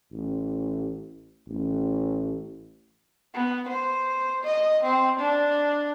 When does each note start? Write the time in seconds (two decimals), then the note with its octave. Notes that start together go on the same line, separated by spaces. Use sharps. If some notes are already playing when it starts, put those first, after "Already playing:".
0.11 A1
1.48 A1
3.34 B3
3.68 C5
4.43 D#5
4.83 C4
5.19 D4